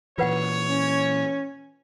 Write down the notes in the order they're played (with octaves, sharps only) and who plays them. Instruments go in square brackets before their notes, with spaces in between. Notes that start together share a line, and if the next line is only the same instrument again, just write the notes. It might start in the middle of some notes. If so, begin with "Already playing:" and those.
[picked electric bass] A#2 E3 [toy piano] F4 B4 F#5 [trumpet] C#5
[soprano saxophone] C#4